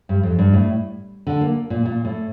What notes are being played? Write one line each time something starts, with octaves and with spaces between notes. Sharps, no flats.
G2
F2
G2
A2
D3
A#3
A#2
A#2
A2